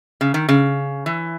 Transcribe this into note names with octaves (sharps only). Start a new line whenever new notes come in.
C#3
D#3
C#3
E3